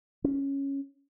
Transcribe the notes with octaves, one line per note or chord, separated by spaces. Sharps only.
C#4